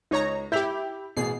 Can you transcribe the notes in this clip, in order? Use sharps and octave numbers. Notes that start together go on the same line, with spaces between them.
C#2 D#4 C#5 A#5
E4 G4 G6 B6 F7
A1 B2 G#4 C7